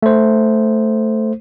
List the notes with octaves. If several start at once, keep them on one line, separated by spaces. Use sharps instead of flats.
A3 C5